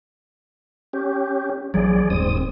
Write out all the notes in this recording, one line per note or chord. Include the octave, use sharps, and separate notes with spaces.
C#4 G4
A#1 E3 F#3 G#4 D5
D#1 G#2 C4 D#6